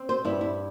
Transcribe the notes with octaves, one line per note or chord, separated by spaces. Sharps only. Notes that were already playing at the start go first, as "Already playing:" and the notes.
Already playing: C4
C5
G2 E4
E4